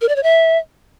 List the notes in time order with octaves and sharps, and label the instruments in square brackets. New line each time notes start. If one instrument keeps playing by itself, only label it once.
[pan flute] A#4
D5
C#5
E5